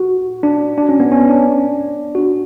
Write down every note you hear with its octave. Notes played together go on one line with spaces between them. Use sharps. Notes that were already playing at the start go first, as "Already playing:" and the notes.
Already playing: F#4
D4
D4
C#4
B3
C#4
D4
F#4